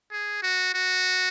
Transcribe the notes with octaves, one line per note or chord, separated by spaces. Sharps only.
G#4
F#4
F#4